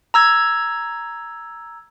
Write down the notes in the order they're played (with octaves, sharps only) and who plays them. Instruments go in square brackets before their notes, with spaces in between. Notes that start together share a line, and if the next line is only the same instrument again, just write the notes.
[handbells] A#5 E6 G#6